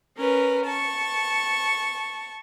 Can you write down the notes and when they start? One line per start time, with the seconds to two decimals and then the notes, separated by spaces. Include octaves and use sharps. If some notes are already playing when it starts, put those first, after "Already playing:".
0.17 C#4 A#4 B4
0.66 A5 C#6